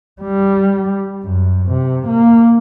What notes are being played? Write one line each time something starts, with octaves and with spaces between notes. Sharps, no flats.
G3
F#2
C3
A#3